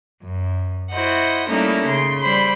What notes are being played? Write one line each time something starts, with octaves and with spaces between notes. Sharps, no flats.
F#2
E4 F#4 C5 D#5 F#5
G3 A3 A#3 C#4 D#4 E4
C#3 C6
G3 C5 B5 C6